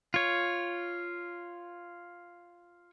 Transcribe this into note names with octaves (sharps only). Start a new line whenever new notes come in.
F4 C#5